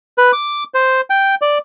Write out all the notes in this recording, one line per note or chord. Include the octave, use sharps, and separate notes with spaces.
B4
D6
C5
G5
D5